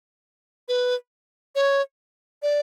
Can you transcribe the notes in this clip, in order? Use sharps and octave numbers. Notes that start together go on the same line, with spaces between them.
B4
C#5
D5